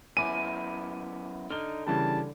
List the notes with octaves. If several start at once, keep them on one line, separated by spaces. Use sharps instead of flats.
F#2 B3 E4 G#5 D6 D#7
D3 D#4 F6 G7
C#3 E3 G3 A5